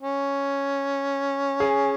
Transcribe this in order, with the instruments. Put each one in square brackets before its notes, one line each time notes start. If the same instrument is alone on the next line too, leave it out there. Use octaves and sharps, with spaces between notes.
[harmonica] C#4
[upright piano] G#4